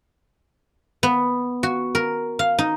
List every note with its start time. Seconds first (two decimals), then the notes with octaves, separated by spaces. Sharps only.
1.03 B3
1.63 F#4
1.95 A#4
2.39 F5
2.59 D#4